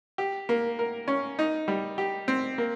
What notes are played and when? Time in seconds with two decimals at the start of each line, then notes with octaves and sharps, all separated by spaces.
0.18 G4
0.49 A#3
0.79 A#4
1.08 C#4
1.39 D#4
1.68 G3
1.98 G4
2.28 C4
2.58 A#3